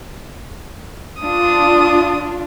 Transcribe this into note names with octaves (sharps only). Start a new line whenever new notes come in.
D4 F4 D#6